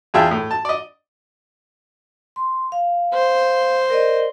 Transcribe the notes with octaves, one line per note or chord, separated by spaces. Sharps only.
E2 F4 G#4 E5 G5 A5
A2
A5
D5 D#5
C6
F5
C5
A#4 D5 D#5